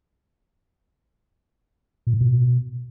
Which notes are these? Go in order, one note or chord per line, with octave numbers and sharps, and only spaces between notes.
A#2
A2
B2